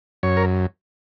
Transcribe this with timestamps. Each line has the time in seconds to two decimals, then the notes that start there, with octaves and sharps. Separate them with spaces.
0.23 F#2 C#5
0.37 A#4